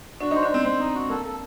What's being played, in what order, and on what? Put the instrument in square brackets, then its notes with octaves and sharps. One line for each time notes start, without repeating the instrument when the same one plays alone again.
[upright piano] D4 [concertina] F#4
[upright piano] D#4 [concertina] C5
[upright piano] D4
[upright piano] C4 [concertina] C5
[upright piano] C4 [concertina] C5
[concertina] D#4
F#4
[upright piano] A#3 [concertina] A4
[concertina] A4